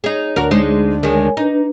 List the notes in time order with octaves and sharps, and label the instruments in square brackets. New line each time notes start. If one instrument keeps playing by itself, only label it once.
[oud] D#4 G#4 [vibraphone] C#5
[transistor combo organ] D2 D4 [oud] F#4 A#4
[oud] G#3 D#4 C5
[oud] D#3 G#3 [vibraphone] A#4 C#5 G#5
[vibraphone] D4 B4 [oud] D#4